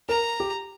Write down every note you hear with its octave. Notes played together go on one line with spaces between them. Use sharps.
A#4 A#5
G4